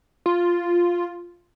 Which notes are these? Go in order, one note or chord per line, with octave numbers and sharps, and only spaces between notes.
F4